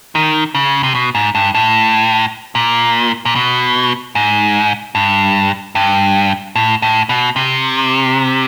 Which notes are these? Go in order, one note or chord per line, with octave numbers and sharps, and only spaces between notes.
D#3
C#3
C3
B2
G#2
G2
A2
A#2
A#2
B2
G#2
G2
G2
A2
A2
B2
C3